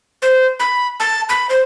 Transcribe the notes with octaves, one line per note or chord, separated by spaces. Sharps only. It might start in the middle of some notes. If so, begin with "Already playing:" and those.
C5
B5
A5
B5
C5